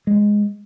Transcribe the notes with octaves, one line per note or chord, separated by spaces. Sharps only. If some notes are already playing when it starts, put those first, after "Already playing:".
G#3